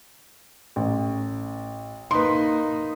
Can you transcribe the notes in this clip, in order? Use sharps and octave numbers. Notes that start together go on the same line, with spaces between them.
A1
A#3 D#4 B4 C6